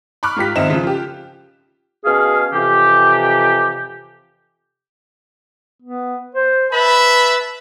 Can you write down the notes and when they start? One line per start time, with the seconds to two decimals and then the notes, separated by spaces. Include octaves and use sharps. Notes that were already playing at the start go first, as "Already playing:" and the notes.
0.23 B5 C#6 D6 F6 F#6
0.36 G#2 F4 G4 B6
0.55 G#1 F2 C4 D#4 E5 E7
0.70 C#3 F3
0.83 F4 G4
2.05 B2 C#4 G#4 F5
2.53 F2 C3 E3 G4
5.82 B3
6.35 C5
6.72 B4 E5 A5 B5